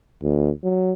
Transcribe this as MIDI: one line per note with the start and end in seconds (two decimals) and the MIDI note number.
0.23 0.51 38
0.64 0.93 54